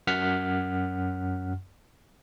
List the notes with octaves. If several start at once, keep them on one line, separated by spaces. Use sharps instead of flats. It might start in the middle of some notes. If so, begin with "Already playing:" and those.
F#2 F#5 F6 B6